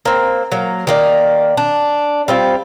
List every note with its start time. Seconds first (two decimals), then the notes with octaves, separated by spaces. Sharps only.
0.05 A#3 C4
0.52 F#3 A#3
0.87 D#3 A#3 D5
1.57 D4
2.28 G3 C4 F4